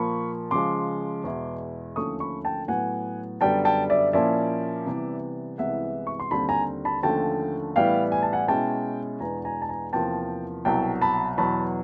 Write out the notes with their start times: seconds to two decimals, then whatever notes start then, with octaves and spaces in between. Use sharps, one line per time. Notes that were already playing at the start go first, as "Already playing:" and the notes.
Already playing: A#2 F3 A#3 B5 C#6
0.51 C#3 F3 G#3 C6 D6
1.24 E2 B2 G#3 B3 E4
1.96 D#2 D3 F3 A3 C#4 C#6 D#6
2.20 B5 C#6
2.45 G5 A5
2.68 A2 F#3 B3 F#5 G#5
3.41 F#2 D3 G3 B3 G5 A5
3.65 G5 A5
3.90 D5 E5
4.13 A#2 F3 A#3 C#4 E4 D5 E5
4.86 C3 E3 G3 B3
5.58 C2 C3 E3 G#3 B3 E5 F#5
6.07 C#6
6.20 C6
6.31 D#2 D3 G3 C4 A5 B5
6.49 G#5 A#5
6.85 A5 B5
7.03 D#2 D3 F3 A3 C#4 G5 A5
7.76 A2 E3 G3 B3 E4 F5 G5
8.12 G#5
8.23 A5
8.32 F#5 G#5
8.48 B2 G#3 C#4 E4 G5 A5
9.20 E2 B2 G#3 B3 D4 G#5 A#5
9.45 G#5 A#5
9.62 A5
9.69 G#5 A#5
9.93 E2 C3 F3 A#3 G5 A5
10.65 C2 B2 F#3 G5 A5
11.01 A5 B5
11.38 E2 B2 F#3 A5 B5